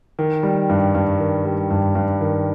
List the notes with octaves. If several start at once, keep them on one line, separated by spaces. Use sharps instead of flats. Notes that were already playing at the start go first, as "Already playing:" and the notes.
D#3
G3
G2
G2
D#3
G3
G2
G2
D#3